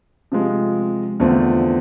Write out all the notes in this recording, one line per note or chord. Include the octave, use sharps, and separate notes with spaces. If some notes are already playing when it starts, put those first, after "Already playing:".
C3 F3 G#3
E2 D3 F3 A3 C4